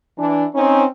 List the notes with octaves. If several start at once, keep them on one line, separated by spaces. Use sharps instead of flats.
E3 D4
C4 C#4 D#4